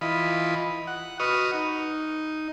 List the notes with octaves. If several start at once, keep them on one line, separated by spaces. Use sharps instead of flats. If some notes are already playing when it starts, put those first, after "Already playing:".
E3 F4 D#5 B5
F#5
F#4 B4 D#5 C#6 D#6 F6
D#4